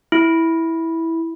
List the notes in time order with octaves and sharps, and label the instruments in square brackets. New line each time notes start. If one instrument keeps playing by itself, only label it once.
[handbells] E4